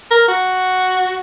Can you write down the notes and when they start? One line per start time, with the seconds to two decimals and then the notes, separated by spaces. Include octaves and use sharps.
0.11 A#4
0.28 F#4